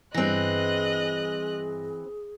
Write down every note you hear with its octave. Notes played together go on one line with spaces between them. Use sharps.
G2 E3 C4 G#4 D#5 F#6 A#6